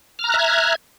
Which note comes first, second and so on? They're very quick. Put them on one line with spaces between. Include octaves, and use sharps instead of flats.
F6 A#5 F#6 E5 G#6